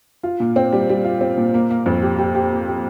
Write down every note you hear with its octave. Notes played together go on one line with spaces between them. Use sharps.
F4
A#2
C4
G3
G3
F4
C4
A#2
A#3
A#3
F2
G4
G4
G4
A#3
G4